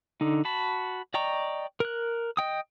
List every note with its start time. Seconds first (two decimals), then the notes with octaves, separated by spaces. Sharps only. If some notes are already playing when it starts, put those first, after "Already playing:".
0.21 D3 D#4
0.45 F#4 A5 B5
1.14 D5 D#5 G5 A#5 C#6
1.80 A#4 F#6
2.37 D#5 G5 D#6